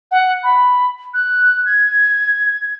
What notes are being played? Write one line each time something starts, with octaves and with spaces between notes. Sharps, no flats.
F#5
B5
F#6
G#6